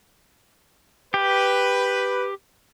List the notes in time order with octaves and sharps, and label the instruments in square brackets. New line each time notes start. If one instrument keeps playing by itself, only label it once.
[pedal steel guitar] G4 [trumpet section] B4